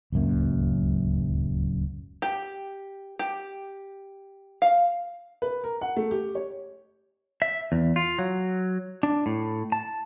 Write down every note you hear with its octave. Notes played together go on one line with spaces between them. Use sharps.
D1 C#2 F#2 A#3
G4
G4
F5
B4
A#4
F#5
A3
G4
C#5
E5
E2
F4
F#3
D4
A2
A5